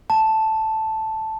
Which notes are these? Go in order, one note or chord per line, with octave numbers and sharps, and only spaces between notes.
A5